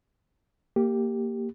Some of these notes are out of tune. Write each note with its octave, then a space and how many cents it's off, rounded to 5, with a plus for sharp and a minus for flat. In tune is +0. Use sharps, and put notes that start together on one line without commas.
A#3 -10 G4 +0